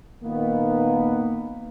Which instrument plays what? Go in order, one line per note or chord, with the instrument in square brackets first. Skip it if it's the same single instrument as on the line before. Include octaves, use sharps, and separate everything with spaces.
[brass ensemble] A#2 D#3 A#3 B3